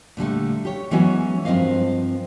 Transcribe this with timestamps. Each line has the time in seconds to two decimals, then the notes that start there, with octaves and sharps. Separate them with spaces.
0.17 A#2 D3 G3 A3
0.65 G4 C#5
0.91 E3 F#3 G#3 B3 C#4 F#4
1.45 G2 F3 C4 A#4 D#5 F5